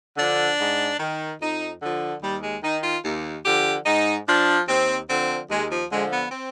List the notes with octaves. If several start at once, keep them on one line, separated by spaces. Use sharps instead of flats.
D3 F3 D4
G#2
D#3
F2 D#4
D3 F3
D#2 G3
G#3
D#3 D#4
F4
D#2
D3 F3 G4
G#2 D#4
F3 D4
D#2 C4
D3 F3 C4
D#2 G#3
F3
D3 F3 G#3
B3
C4